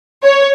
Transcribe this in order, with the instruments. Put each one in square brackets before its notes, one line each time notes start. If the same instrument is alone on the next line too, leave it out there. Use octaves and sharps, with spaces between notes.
[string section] C#5